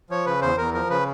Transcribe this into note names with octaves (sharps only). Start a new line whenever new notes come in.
F3 C#5
C#3 B4
E2 C5
E2 A#4
F3 A#4
C#3 B4